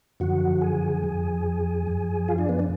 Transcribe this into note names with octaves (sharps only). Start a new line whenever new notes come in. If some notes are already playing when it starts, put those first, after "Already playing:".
F#2 D3 F3 F#4 F#5
G#4 G#5
F2 F3
F#2 F3
F4 F5
D4 D5
B3 B4
D4 D5